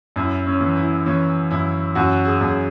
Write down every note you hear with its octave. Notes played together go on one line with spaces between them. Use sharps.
F#2 E4
C#4
E3
E4
E3 C#4
F#2 E4
F#2 F#4
G#4
F#2
G#4